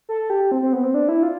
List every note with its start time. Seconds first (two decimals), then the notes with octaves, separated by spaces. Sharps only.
0.09 A4
0.30 G4
0.52 C4
0.62 C4
0.73 B3
0.83 C4
0.94 D4
1.09 E4
1.23 F4